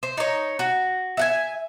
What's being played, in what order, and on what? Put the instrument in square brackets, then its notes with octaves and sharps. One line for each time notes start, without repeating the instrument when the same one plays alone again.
[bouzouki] C5
D#4 C#5
F#4
E5 F#5 G#5